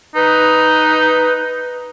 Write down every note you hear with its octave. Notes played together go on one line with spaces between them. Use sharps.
D#4 B4